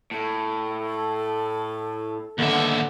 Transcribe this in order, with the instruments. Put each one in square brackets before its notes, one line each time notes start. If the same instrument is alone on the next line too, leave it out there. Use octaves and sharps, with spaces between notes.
[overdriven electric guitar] A2 [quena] A4
[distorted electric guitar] D#2 E5 [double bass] D3 B3